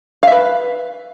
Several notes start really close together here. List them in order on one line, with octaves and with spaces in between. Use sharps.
F5 E5 B4